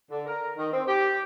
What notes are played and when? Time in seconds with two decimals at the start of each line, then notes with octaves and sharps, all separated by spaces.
0.11 D3
0.26 A#4
0.57 D#3
0.72 C4
0.87 G4